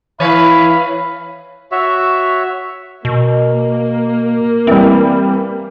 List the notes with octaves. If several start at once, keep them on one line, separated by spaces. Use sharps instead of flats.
E3 E4 B4 C#5 F5 B5
F#4 C#5 E5
B2 A#3
E3 G3 C4